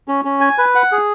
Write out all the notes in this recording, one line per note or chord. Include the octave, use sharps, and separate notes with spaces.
C#4
C#4
G#5
B4
F#5
G#4